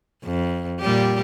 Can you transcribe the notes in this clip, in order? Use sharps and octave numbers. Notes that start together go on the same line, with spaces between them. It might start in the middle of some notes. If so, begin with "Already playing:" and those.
F2
A#2 G3 G4